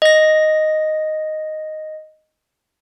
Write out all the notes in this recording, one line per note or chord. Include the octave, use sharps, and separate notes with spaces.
D#5 A#6